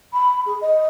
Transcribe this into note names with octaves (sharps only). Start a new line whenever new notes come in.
B5
G#4
D#5